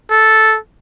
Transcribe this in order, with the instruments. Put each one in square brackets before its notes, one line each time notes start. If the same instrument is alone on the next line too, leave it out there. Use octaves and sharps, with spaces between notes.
[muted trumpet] A4